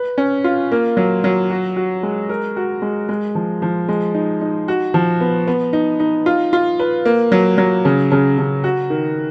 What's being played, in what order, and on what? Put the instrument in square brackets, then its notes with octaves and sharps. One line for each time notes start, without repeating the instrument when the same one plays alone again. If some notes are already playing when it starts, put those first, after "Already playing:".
Already playing: [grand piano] B4
C#4
F4
A#3
F#3
F#3
F#4
F#4
G#3
A#4
F#4
G#3
G#3
F3
F3
G#3
D#4
D#4
F#4
F3
B3
B3
D#4
D#4
F4
F4
B4
A#3
F#3
F#3
C#3
C#3
C#3
F#4
D#3